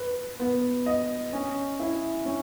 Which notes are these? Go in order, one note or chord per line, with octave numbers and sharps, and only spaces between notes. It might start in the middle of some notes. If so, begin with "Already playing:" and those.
Already playing: B4
B3
D#5
C#4
E4
C#4